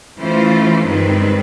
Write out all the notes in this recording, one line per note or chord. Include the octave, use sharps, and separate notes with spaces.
E3 A3 C#4 F4 C5
G2 D#3 G#3 C4 B4